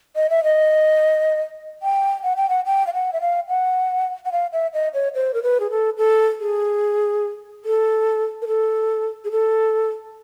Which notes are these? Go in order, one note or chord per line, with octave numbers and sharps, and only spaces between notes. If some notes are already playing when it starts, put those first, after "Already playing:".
D#5
E5
D#5
G5
F#5
G5
F#5
G5
F5
F#5
E5
F5
F#5
F#5
F5
E5
D#5
C#5
C5
A#4
B4
G#4
A4
A4
G#4
A4
A#4
A4
G#4
A4